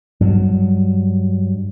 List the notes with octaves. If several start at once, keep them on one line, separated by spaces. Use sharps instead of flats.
G2 F#3